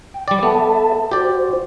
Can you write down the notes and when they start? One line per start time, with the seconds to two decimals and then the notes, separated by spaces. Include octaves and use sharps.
0.14 G5
0.28 G3 D5
0.43 B3 A4 E5 A5
1.11 F#4 G4 C5 D5